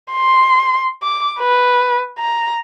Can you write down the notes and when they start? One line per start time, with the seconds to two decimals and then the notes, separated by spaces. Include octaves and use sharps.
0.12 C6
1.03 D6
1.40 B4
2.19 A#5